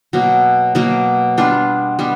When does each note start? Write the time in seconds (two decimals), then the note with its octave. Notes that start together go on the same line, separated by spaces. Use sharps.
0.13 B2 F#3 A#3
0.75 B2 F#3 A#3
1.38 G3 B3 D4 F4
1.99 G3 B3 D4